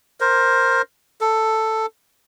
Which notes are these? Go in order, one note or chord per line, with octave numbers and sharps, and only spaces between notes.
A#4 C5
A4